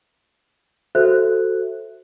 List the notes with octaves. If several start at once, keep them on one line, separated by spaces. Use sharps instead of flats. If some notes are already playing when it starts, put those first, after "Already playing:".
F#4 A4 C5 E5 F#6